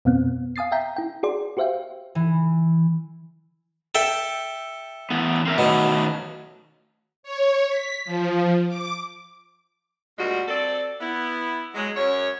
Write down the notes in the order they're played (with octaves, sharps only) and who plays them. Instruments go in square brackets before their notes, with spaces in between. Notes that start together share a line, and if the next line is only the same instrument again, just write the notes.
[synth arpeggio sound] F2 B2 B3 C4
F5 G#5 D#6 A6 C7
E5 G5 A#5 G6 B6
E4 G5
F#4 G#4 D5 C6
F#4 G4 C5 E5 F5 G5
[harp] E3
[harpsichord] A4 E5 G5
[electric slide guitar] E3 A3 B3
C4 A#4 E5
[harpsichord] B2 [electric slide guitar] D#3 F#3 A3
[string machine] C#5
B6
F3
D6
[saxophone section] D2 A#2 G3 G#3 F#4 A#4
C4 A4 D5
B3 E4
F#3 G#3
F#2 C#5